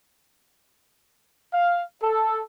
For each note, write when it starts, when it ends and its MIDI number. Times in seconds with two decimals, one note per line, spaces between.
1.53 1.82 77
2.01 2.40 69